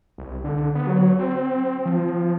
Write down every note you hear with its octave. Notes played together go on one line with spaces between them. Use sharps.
C2
D3
B3
F#3
C4
F3